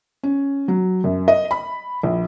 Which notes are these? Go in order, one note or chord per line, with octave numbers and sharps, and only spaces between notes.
C#4
F#3
F#2
D#5
B5
A#1